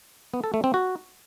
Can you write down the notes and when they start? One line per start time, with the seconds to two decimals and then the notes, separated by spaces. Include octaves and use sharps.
0.34 B3
0.44 A4
0.54 A3
0.64 C4
0.74 F#4